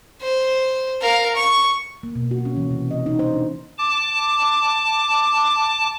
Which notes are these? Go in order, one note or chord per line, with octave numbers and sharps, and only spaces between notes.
C5
A#4 F5
C#6
A#3
B2
F#4
C#4
E3
C3
D#5
D#4
C5
D4
A5 D6